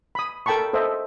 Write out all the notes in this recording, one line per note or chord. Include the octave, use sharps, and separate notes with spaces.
B5 D#6
A4 A#4 G5 A5 B5 C#6
A4 C5 D#5 E5